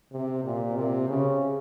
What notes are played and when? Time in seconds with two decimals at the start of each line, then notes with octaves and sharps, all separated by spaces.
0.12 C3
0.44 A#2
0.76 C3
1.08 C#3